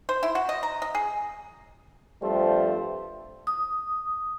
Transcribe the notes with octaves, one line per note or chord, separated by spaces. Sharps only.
C5
E4
F#4
D#5
A#5
D#5
G#4
G2 F3 G3 A3 C4 C5
D#6